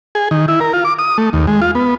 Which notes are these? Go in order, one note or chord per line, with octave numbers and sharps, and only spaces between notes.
G#4
D#3
E4
A#4
F4
D6
D#6
A3
D#2
G#3
F4
B3